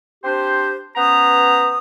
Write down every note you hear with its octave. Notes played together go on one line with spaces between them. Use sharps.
C4 D4 G4 C5
B3 C#4 B4 C5 A#5 D#6